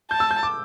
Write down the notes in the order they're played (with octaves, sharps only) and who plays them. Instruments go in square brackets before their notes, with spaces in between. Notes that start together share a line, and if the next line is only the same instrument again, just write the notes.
[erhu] A5 [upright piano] G6
[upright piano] E6
G6
D6